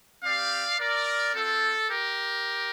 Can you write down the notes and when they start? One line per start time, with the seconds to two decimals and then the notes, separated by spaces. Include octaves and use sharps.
0.24 C4 G4 D5 F5
0.80 A#4 D5
1.34 C4 F4 A4
1.89 G4 A#4